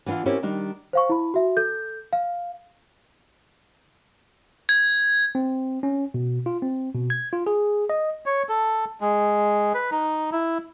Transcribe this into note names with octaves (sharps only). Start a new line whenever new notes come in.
E3 B3 D4 E4 F4
C4 C#4 E4 G4 A#4 C#5
D#3 G3 D4 D#4
C5 F5 C#6
E4 B5
F#4 E5
A4 G6
F5
G#6
C4
C#4
B2
F4
C4
B2
G#6
F4
G#4
D#5
C#5
A4
G#3
B4
D#4
E4